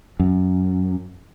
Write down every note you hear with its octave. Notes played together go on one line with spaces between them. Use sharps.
F#2